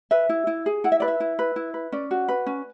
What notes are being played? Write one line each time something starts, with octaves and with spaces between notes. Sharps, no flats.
B4 E5
E4
E4
G#4
E4 F#5
E5
B4 D5
E5
E4
B4
E4
B4
C#4 D5
F#4
B4
C#4